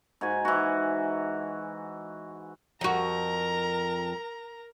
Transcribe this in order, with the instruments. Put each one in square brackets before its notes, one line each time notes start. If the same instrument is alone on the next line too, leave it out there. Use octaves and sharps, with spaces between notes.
[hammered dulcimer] G#2 F#4 G#5
E3 F#4
[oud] F2 F#4 [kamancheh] A#4 A#5